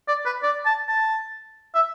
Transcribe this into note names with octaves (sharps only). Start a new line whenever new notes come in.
D5
B4
D5
A5
A5
E5